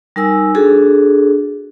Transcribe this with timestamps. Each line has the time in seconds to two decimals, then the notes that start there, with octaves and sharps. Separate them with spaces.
0.16 G3 D#4 A#4 G#5 E6
0.55 D4 F#4 G#4 A4